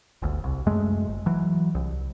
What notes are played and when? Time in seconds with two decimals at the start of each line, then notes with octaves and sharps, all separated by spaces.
0.22 G1 D2
0.44 C2
0.66 F#2 G#3 A3
1.07 G1
1.26 E3 F#3
1.75 C2